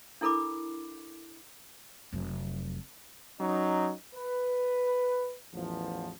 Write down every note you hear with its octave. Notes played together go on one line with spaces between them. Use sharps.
D4 E4 A4 A#4 B5 D6
F1 F#3
F#3 C#4 D#4
B4
A1 E2 F3